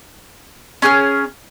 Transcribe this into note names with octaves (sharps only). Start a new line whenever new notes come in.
C#4 G#4 A#4 F6